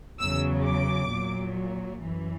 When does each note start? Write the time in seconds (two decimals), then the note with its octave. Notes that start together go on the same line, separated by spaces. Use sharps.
0.20 E2 C#3 F#3 E6
0.65 D6
1.10 A#2 F#3
2.00 F#2 E3